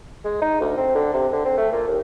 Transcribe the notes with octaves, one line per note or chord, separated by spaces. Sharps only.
G#3
D#4
D2
C4
D3
C3
D3
C4
A3
A#2
D#2